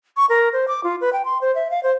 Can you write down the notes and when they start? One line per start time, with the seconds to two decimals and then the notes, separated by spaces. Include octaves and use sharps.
0.17 C#6
0.29 A#4
0.53 C5
0.68 D6
0.84 F4
1.01 B4
1.13 G5
1.25 C6
1.41 C5
1.55 E5
1.71 F5
1.83 C5